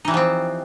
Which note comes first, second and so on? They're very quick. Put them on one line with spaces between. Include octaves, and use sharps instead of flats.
D#4 E3 G3 F3 C4